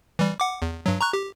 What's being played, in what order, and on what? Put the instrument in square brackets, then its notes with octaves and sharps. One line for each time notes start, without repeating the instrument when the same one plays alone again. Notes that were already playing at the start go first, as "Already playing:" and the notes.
[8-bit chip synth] E3 G3
F#5 D6
E2
G2 F#3
A#5 C#6 F#6
G4